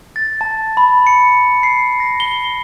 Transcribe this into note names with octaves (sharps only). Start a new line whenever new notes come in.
A6
A5
B5
C#7
C7
A#6
G7